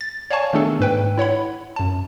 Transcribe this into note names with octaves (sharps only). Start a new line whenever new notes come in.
A6
C#5 D5 F5 G#5 A5 C#6
D#3 A3 B3 D4 G#4 A4
G#2 B4 G5
E4 C#5 F#5 B5
F#2 A5